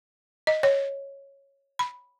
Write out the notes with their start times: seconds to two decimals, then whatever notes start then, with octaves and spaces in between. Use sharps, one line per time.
0.47 D#5
0.63 C#5
1.79 B5